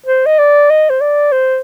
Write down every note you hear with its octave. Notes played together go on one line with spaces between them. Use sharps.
C5
D#5
D5
D#5
C5
D5
C5